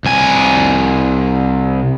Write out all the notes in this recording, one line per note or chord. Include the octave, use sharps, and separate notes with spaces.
C2 G#5